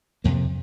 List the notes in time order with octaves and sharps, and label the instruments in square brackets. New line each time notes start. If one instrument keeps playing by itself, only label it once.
[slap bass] F2 C3 A#3